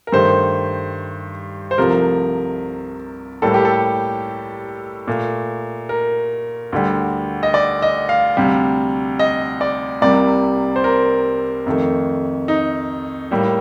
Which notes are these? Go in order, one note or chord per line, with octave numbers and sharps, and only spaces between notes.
A#4
G2 D#3 A3 C5
C5
C2 C3 F3 A3 A#4
A2 G3 A#3 A4
G4
A4
A#2 A3
A#4
D2 D3 G3
D#5
D5
D#5
F5
D2 C3 G3
D#5
D5
C2 C3 G3 A#3 D5
C5
A#4
F2 D#3 A3
D#4
A2 G3 A#3